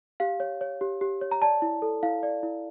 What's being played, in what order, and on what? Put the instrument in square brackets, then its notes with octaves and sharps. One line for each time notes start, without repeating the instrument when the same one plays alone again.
[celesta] G4 F5
C#5
C#5
G4
G4
C#5
A#5
D5 A5
E4
A4
E4 F5
D5
E4